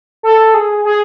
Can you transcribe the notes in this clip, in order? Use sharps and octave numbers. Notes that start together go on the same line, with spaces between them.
A4
G#4
G#4